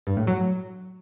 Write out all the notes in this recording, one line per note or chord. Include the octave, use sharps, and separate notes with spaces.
G2
A2
F#3